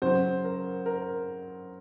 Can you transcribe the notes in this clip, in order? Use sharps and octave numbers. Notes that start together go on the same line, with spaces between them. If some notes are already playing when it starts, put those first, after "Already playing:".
C#3 F#3 C5
A#4
A#4